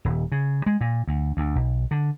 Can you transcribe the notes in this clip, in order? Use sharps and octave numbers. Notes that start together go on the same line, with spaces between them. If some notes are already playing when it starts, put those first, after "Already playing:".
D#1
C#3
G#3
A#2
D2
D2
B1
D3